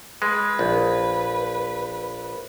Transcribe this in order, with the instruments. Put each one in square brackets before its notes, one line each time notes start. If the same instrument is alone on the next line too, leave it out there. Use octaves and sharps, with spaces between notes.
[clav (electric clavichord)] G#3 [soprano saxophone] B4
[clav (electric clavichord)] A#1